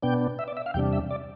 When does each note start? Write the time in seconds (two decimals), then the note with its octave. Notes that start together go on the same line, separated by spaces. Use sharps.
0.03 B2 B3 D4 G5
0.39 E5
0.48 D5
0.57 E5
0.66 F5
0.74 E2 C3 G3 D4 G5
0.93 E5
1.11 D5